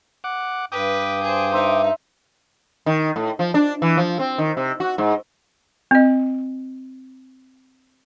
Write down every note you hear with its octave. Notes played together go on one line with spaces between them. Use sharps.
F#5 D6
G2 B4 G5 D6 D#6
G#4 C5
D#4 C5 E5
D#3
A2
F3
D4
E3
F3
C4
D#3
C3
F#4
G#2
C4 D#5